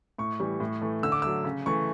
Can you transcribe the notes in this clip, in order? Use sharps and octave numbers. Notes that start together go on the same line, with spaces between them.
A2 C#6
E3 G3
A2
E3 A3
D3 E6
D6
F#3 A3 E6
C#3
E3 A3 C#6